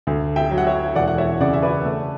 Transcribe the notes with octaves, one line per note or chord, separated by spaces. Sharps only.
D2
E5 G5
F#3
F#5
C#5 E5
E1 D5 F#5
F#5
C#5 E5
C#3 D5 F#5
E5
B4 D5
A3